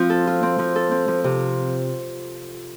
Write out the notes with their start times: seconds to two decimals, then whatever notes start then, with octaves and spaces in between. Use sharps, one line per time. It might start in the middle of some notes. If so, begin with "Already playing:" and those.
Already playing: F3 C4 F4
0.10 A4
0.27 F4
0.43 C4
0.59 F3
0.76 A4
0.91 C4
1.08 F3
1.24 C3